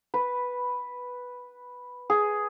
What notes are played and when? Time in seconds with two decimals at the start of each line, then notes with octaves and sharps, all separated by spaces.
0.14 B4
2.10 G#4